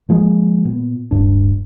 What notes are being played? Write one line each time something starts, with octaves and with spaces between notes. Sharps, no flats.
D#3 F3 G#3 A#3
A#2 B3
D1 G2 D4